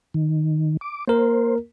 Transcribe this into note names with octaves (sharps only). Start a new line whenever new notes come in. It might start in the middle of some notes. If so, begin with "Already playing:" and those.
D#3
D6
A#3 A#4 C5